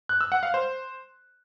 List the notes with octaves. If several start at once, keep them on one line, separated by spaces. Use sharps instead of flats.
F#6
E6
F#5
F5
C5